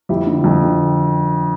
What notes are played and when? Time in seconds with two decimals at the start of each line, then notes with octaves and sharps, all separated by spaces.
0.09 F2 E4 G4
0.27 D3
0.44 F2
0.62 D3